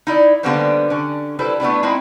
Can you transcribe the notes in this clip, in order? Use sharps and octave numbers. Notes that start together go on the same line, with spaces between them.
D#4 E4 D5
D3 G3 A#3 B3 C#4 C5
D3 C#4
G3 E4 A4 B4 C5
A3 B3 D4 E4
G#3 C4 D#4 E4